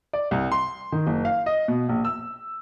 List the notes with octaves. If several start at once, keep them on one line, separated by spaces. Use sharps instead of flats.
D5
C2
C6
D#3
F#1
F5
D#5
B2
A#1
E6